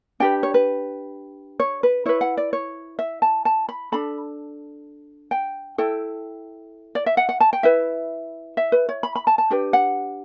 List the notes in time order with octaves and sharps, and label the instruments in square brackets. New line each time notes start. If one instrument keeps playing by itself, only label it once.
[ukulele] D4 G4 B4 G5
C#5
B4
C#5
B4
E4 B4 C#5
F#5
D5
C#5
E5
A5
A5
B5
D4 A4 B5
G5
E4 A4 G5
D5
E5
F#5
F#5
A5
G5
E4 B4 E5
E5
B4
C#5
B5
B5
A5
A5
D4 G4 B4 G5
F#5